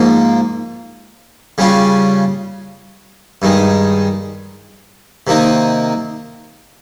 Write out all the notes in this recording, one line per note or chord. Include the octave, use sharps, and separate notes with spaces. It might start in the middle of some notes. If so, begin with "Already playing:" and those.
Already playing: G#2 F3 A#3
C#3 G3 C#4 F4
G2 D#3 G#3
C3 D#3 A#3 D#4